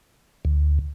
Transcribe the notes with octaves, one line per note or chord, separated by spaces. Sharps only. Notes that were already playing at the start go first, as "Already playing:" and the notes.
D2